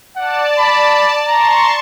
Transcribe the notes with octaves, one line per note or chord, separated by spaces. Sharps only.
D5 F#5 A5
B5
A5 A#5 C6 C#6